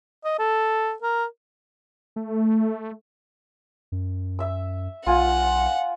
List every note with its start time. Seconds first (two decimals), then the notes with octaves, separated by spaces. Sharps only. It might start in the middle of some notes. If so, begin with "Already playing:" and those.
0.25 D#5
0.39 A4
1.02 A#4
2.16 A3
3.92 F#2
4.39 E5 E6
5.06 B1 F4 F#5 G#5